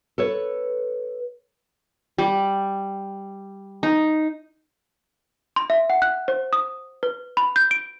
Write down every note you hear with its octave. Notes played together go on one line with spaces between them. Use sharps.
A4 B4 C#5
G3
D#4
C6
E5
F#5
F#6
C5
D#6
B4
B5
G6
D7